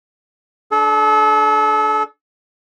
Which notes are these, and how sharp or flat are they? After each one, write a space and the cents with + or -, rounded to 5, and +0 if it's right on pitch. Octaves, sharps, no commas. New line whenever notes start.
D4 +0 A4 -35